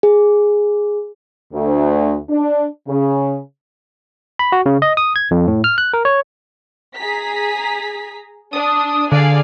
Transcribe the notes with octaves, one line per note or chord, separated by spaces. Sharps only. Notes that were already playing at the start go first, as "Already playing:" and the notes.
G#4
D2
D4
C#3
B5
F#4
C#3
D#5
D#6
G#6
F2
A2
F6
F#6
A#4
C#5
G#4 A#5 B6
D4 D#6
D3 G#4 D5 F5